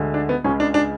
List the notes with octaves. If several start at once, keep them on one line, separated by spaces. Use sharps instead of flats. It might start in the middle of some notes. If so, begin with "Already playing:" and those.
Already playing: D2 D3 G#3
D4
B3
C#2 C#3 G#3 C#4
D4
D4